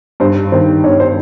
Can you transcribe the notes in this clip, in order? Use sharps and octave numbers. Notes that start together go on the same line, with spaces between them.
G2 C5
D#3 C5
G2 C#5
C5